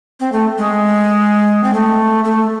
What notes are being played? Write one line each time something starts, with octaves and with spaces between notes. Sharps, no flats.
C4
A3
G#3
C4
A3
A3